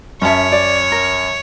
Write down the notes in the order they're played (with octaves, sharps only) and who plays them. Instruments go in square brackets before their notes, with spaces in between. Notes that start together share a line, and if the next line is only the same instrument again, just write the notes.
[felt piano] F#2 A5 [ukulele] C#4 E5 [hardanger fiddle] C#5
[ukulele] D5
A#4